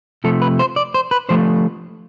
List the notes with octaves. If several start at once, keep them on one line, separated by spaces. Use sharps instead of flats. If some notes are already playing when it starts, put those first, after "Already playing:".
C3 F3 A3 A4
B4
C5
D5
C5
B4
D3 F3 A3 C5